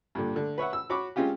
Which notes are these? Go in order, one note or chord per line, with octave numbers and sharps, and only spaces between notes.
G2 A#2 D3
D3 A3
B4 C#5 E5 F#5
E6
F#4 C#5 B5 D6
G#3 C4 C#4 F4 G4